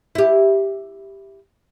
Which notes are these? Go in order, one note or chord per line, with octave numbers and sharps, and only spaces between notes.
E4 G4